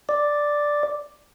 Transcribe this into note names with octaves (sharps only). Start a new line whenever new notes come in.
D5